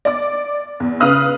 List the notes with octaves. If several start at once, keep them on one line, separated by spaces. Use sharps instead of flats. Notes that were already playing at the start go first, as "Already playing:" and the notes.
D5 D6
E2
C#3 B4 F5 D#6 F6